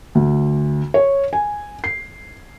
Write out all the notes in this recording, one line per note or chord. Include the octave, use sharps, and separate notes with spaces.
D2
C#5
G#5
C7